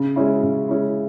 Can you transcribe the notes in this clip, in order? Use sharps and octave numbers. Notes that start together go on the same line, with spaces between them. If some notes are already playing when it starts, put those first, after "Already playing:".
Already playing: C#3
G#3 C#4 E4
C#3
G#3 C#4 E4